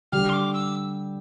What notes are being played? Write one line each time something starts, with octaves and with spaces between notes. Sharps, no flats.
D3 G3 D4 G4 F6
C6
D6
E6